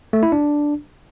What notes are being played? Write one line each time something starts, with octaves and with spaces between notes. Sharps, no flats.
A3
E4
D4